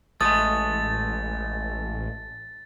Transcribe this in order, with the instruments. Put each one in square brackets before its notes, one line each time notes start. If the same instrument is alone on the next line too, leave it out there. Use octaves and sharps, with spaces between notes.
[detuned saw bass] A1 [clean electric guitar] G#3 A3 [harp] D#6 [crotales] A6